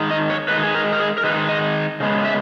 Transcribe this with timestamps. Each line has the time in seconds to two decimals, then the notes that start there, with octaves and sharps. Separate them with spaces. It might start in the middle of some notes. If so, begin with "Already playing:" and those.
Already playing: D#3 G#3 D#4
0.11 D#5
0.30 C#5
0.48 D#3 G#3 D#4 B4
0.63 G#4
0.75 A#4
0.93 A#4
0.99 G#4
1.18 A#4
1.24 D#3 G#3 D#4 B4
1.49 D#5
2.00 C#3 G#3 B3
2.25 E5